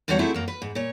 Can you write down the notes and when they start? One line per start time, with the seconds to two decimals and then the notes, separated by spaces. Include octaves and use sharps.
0.08 E2 D3 G3 F#4 C#5 F#5
0.19 A3 C4 E4 F#4 G#4 A4
0.34 F#2 A#3
0.48 B4
0.62 G#2
0.75 A#2 C#5